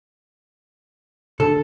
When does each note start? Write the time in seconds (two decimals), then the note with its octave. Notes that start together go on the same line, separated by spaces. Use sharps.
1.40 D3 A4